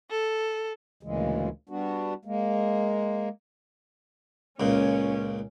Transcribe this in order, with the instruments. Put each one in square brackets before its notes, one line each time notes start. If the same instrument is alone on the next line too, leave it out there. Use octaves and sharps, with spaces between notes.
[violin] A4
[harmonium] D2 A#2 C#3 E3 G#3
G3 B3 D4 F#4
G#3 A#3
[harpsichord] C#2 A#2 [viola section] C#4